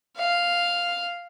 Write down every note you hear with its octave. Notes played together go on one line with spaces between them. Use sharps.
F5